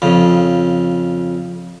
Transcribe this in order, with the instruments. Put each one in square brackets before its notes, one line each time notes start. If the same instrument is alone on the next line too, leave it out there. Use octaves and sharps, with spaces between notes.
[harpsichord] F2 C#3